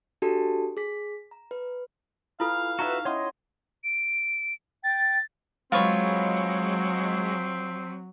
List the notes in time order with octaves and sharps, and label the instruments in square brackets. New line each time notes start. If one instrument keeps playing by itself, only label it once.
[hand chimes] D4 F#4 G4 A4 A5
G#4 B6
A#5
B4
[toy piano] E4 F4 A4 [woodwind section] B4 G#5 F6 [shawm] F5
[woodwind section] C#2 B4 [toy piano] D#4 A#5 C#6 [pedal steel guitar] F#4 E5
[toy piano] C#4 F#5 [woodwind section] E4 D#5 [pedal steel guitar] C#5 C6 D#6
[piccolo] D7
[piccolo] G5 [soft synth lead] A6
[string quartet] F#3 [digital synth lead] G#3 [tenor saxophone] C4 [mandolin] F4 B4 C#5